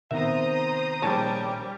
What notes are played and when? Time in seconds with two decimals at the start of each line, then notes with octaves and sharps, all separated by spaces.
0.11 C3 D#3 B3 C5 E5 A#5 D#6
1.02 A#1 G3 C#5 A5